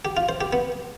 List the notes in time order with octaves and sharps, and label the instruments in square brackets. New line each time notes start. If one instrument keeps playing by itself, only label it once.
[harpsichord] G4
F4
C5
G4
B3